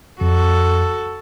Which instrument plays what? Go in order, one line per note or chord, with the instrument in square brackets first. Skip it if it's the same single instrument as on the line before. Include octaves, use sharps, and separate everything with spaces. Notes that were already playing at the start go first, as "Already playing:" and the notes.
[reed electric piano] F2 [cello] F#4 A4